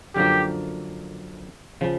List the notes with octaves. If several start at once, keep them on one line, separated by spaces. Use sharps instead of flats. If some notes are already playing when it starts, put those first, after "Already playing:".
F#2 D3 F3 A#3 G4
C#3 F3